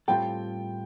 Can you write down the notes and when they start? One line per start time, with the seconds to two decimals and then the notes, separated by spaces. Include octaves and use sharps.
0.08 A2 G3 C4 F4 A4 G5